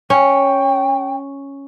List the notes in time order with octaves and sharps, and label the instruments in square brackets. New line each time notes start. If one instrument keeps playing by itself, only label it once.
[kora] C#4 [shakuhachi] G5